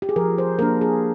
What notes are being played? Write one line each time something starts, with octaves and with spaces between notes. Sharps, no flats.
G4
G#4
F3 A#4
C5
A#3 D4 A#4
G#4